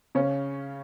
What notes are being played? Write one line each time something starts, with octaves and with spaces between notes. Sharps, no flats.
C#3 C#4